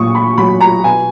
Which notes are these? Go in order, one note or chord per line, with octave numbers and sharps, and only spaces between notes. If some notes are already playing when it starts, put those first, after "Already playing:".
Already playing: A#2 F#3 C#6 D#6
B5
F#3 B5
A#5
B2 G#5